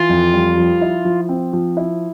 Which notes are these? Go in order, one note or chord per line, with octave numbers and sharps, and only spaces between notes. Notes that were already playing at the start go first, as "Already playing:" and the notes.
Already playing: E3 F4
F2
G3
F3
E4
F3
C4
F3
E4